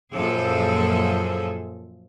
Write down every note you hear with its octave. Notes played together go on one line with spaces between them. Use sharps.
F#2 A#2 F3 G#4 A4